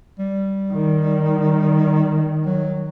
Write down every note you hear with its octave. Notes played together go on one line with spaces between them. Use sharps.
G3
D#3
F#3